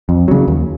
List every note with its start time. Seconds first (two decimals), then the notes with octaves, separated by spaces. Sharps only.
0.09 F2
0.28 C#3 F#3
0.47 D#2